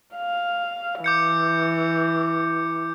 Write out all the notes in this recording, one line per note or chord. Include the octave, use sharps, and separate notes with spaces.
F5
E3 D6 G6 C#7